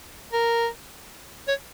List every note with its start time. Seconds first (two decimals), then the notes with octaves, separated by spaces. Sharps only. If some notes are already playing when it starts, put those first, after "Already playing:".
0.33 A#4
1.48 C#5